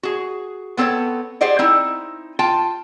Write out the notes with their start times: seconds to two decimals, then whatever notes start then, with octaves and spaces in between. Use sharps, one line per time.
0.03 F#4 G#4
0.77 B3 C4 A4 B4 C#5
1.41 G4 G#4 C5 D5 D#5 F#5
1.59 C4 D#4 E4
2.39 F4 G5 A5